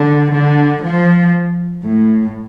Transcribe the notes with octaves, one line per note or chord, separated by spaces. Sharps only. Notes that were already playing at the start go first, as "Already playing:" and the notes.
Already playing: D3
D3
F3
A2